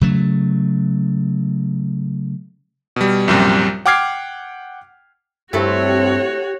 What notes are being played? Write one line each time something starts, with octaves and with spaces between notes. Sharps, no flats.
C#3 F#3 A3
B2 G3
A#1 F#2 C3 G3
F#5 G5 D6 F6 G#6 C7
G2 A3 C4 E4 F#4 G4 A4 C#5